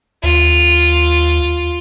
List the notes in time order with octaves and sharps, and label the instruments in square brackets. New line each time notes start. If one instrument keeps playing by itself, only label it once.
[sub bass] D#2 [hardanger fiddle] F4